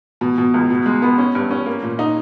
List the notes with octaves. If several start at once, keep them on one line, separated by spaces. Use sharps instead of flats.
B2
B2
C#2
B2
G#3
B3
C#4
G2
C#4
A#3
A#2
D#4